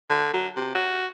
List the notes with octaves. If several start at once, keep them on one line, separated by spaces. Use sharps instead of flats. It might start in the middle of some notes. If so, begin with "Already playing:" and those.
D3
F#3
C3
F#4